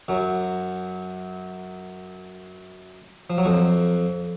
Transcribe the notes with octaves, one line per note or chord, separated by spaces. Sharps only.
F#2 F#3
F3
F#3
F2 F3